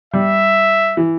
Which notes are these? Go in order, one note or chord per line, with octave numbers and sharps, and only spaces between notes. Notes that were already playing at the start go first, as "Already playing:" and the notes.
G3 E5
E3